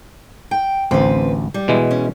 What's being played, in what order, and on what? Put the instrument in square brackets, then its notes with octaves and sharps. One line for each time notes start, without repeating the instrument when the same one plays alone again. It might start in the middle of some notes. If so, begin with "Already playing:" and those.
[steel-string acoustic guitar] G5
[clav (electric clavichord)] A1 D2 [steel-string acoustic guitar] C4 B4
[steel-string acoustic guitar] G3
[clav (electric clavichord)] B2 E3 G#3
[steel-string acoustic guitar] C#4